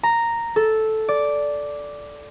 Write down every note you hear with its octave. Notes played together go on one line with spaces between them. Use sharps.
A#5
A4
D5